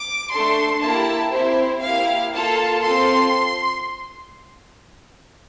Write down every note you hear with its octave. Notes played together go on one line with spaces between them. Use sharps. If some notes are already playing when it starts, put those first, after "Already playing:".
Already playing: D6
A3 D4 A4 C6
A#3 E4 G4 A5
C4 E4 G4 C5
A#3 E4 G4 F5
A#3 F4 A4 A5
C4 F4 A4 C6